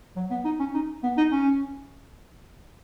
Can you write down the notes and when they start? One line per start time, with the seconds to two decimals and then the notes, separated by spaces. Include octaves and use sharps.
0.16 F#3
0.30 B3
0.45 D#4
0.59 C#4
0.74 D#4
1.03 B3
1.17 D#4
1.32 C#4